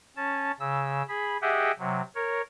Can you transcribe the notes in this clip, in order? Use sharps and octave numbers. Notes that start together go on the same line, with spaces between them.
C#4 A5
C#3 E6
G#4 B5
G4 G#4 D#5 E5 F#5 G5
C3 F#3
A#4 C#5